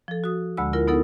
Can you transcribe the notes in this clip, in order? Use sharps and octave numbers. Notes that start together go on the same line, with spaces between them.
F3 A4
F#4 D#6
D2 D3 G#3 B5 E6
E4 F4 A#4
B3 D#4 E4 A4 A#4 F#5